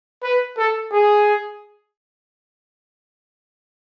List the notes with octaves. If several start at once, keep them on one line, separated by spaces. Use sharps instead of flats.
B4
A4
G#4